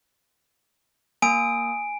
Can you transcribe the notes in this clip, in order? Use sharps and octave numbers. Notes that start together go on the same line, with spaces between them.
A#3 G#5 D#6 D7